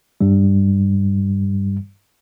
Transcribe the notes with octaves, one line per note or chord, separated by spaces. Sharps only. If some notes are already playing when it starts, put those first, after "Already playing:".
G2 G3